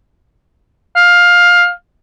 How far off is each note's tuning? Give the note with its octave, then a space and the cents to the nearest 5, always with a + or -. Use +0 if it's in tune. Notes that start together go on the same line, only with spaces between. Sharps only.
F5 +15